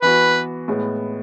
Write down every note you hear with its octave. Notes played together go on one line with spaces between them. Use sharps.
E3 B3 F#4 B4
A2 G#3 B3